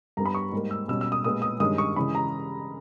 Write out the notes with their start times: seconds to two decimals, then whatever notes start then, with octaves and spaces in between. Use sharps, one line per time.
0.17 G2 G3 B3 A#5
0.26 B5
0.35 C#6
0.52 G#2 G3 A#3
0.71 E6
0.88 B2 G3 C#4 E6
1.01 E6
1.12 D#6
1.24 A#2 G#3 B3 D#6
1.42 D#6
1.60 G2 D#3 G#3 C#4 D#6
1.78 C#6
1.96 C#3 E3 G#3 C#4 B5
2.15 A#5